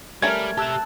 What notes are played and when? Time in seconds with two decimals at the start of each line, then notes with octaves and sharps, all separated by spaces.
0.22 G3 A3 C#4 A#4 G#6
0.58 G4 E5 A5 E6 F#6